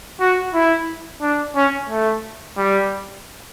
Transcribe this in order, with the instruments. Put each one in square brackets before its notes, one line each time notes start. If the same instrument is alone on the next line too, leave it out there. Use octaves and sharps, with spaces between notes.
[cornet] F#4
E4
D4
C#4
A3
G3